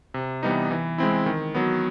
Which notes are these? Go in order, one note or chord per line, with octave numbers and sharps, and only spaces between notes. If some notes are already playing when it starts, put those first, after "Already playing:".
C3
E3 G3 B3 D#4
E3
G#3 C4 E4
D#3
F#3 B3